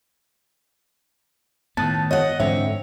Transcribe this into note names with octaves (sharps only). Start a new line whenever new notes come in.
A2 D#3 B3 A5 D#6 F#6 A6
C#5 D#5 F#5
G#2 D3 E3 C4 C#5 E5